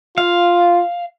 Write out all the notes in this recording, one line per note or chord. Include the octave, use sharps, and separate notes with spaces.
F4 F5